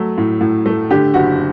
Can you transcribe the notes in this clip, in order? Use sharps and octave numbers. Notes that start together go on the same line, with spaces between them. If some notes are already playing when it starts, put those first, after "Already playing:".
Already playing: F#3 A3
A2
A2
A3
D3 G4
F#1 F#4